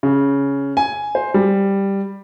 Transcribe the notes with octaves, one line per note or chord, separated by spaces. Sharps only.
C#3
G#5
C5
G3